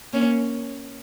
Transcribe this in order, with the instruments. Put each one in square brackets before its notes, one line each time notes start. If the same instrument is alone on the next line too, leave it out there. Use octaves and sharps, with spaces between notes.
[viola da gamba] A#3 C#4